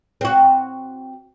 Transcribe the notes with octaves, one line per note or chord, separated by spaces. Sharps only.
C4 F#4